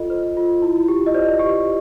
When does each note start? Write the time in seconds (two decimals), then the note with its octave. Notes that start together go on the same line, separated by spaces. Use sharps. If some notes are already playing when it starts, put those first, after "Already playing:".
Already playing: F4 A4 D#5
0.10 C5
0.37 F4
0.62 E4
0.88 G4
1.06 D#5
1.14 C5 D5
1.39 G4